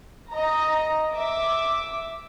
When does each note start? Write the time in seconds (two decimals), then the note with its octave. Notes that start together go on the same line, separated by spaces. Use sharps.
0.30 D#5 A#5
1.12 E5 D6